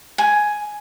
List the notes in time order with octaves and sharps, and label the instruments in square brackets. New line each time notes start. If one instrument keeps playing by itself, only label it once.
[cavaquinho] G#5